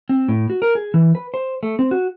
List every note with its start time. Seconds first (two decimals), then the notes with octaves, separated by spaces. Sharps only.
0.09 C4
0.28 A2
0.50 F#4
0.62 A#4
0.75 G#4
0.94 E3
1.15 B4
1.34 C5
1.63 A3
1.79 C4
1.91 F#4